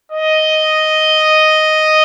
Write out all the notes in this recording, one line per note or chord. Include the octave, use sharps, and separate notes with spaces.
D#5